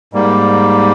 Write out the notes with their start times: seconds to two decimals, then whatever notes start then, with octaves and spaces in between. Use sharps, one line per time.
0.13 G#2 G3 A#3